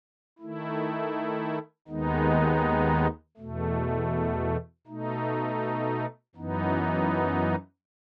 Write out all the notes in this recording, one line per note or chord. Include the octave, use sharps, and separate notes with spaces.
D#3 A3 E4
D#2 D#3 G#3 B3 D#4
E2 B2 A3
B2 A3 D#4
F#2 E3 B3 D#4